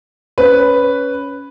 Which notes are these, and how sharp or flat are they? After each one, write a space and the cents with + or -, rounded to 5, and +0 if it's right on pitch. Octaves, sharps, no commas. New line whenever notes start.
C#4 +10 B4 +0